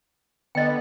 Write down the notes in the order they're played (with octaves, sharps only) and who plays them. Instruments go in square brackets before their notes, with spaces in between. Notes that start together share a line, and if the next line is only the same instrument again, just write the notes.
[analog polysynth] D3 B3 [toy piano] D#5 G5